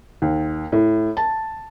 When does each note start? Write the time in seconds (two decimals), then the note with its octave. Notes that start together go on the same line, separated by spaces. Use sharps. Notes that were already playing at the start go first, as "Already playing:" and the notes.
0.22 D#2
0.72 A2
1.17 A5